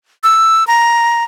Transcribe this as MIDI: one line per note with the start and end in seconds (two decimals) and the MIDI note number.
0.23 0.66 88
0.67 1.24 82